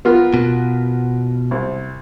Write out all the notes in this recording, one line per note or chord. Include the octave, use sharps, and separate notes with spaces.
B3 F4 A#4
B2
C2